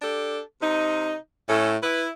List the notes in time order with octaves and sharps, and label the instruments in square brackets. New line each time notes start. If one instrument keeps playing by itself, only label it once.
[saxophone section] D4 G4 A4
C3 D#4
[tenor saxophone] A2 [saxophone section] C#4 A4
[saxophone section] E4 [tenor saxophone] B4